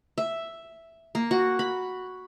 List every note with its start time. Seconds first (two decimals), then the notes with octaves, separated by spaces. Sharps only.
0.18 E5
1.15 A#3
1.31 F#4
1.59 B5